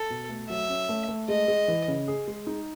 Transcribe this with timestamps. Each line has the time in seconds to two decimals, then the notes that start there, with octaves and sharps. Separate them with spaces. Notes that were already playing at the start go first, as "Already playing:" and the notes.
Already playing: A4
0.10 B2
0.29 A3
0.49 F#3 E5
0.69 C#4
0.89 A3
1.08 A3
1.28 G#3 D#5
1.48 G#3
1.68 E3
1.88 C#3
2.08 G#4
2.28 G#3
2.47 D#4